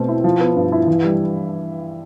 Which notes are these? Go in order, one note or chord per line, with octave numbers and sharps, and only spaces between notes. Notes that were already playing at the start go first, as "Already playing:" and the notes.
Already playing: B2 A3 C4
E4
F3
B3
G2
E4
E3
G3